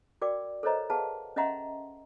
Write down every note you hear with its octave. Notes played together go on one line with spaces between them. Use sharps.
F#4 A#4 D5 G5 D6
A4 A#4 C5 C#5 D#5 A#5
G#4 B4 F5 F#5 A5
C#4 D#5 E5 F#5 A#5 C6